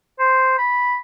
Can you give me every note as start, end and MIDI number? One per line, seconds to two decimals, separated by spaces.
0.19 0.57 72
0.58 0.96 83